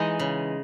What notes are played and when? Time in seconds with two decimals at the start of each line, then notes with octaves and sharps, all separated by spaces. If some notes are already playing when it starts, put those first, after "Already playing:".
Already playing: E3 G#3 D#4 D#5
0.19 C#3